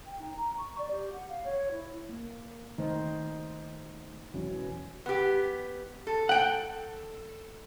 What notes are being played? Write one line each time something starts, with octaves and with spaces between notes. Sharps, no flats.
G5
D#4
A#5
C#6
D5
G4
F#5
F5
C#5
E4
A#3
D#3 A3 D#4 C5
E1 E3 F#3 C#4
B3 G4
A4
F#5 G5